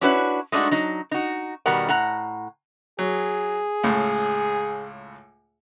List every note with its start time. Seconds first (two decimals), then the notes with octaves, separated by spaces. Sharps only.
0.01 C#4 D4 E4 F#4 B4 C#5
0.52 G#3 A3 D4 D#4 F#4
0.71 F#3 D#4
1.11 D#4 F#4
1.66 B2 D#3 G3 A#4 F#5
1.89 A2 F#5 A#5
2.99 F#3 G#4
3.84 C#2 A2